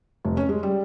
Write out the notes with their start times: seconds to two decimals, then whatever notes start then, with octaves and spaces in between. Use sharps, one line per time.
0.25 F1
0.37 C#4
0.49 G#3
0.63 G3